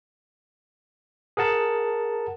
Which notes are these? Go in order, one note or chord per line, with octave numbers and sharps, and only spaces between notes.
G#4 A#4 F#5 A5